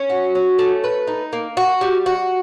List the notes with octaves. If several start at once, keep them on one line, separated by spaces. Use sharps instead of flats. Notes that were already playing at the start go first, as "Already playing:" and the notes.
Already playing: C#4
F#4
C#4
A3
B4
D#4
A#3
F#4
G3
F#4